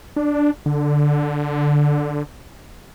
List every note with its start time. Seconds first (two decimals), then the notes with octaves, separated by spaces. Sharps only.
0.16 D4
0.66 D3